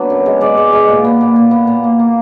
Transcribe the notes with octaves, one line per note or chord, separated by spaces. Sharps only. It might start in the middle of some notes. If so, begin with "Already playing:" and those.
Already playing: F#3 B3 D4 F#4 B4 D5
F#2
G#3
G#3 D5
G#3
G#3
A#2
B3
A#2
A#2
B3
A#2
A#3
A#3